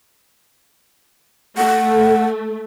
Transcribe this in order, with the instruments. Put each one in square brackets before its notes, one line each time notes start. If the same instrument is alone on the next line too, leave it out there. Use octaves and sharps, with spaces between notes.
[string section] A3 [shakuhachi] F#5